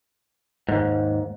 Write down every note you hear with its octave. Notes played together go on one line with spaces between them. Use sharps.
D#2 G#2